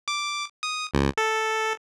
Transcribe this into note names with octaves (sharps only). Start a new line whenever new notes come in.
D6
D#6
C#2
A4